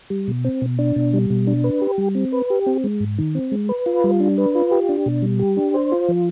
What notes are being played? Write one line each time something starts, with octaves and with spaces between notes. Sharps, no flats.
G3
B2
C4
B2
D4
B2
G3
B2
D4
B4
G4
G3
C4
B4
G4
C4
G#3
G#2
D#3
C4
G#3
B4
F4
G3
D4
B4
F4
G4
D4
B2
G3
G4
D4
C5
F4
F3